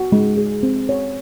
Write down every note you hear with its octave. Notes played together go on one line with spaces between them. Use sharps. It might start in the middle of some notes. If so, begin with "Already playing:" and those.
Already playing: F#4
G#3
G#4
C4
C#5